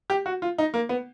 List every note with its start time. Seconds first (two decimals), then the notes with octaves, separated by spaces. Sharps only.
0.10 G4
0.26 F#4
0.42 F4
0.58 D#4
0.74 A#3
0.89 B3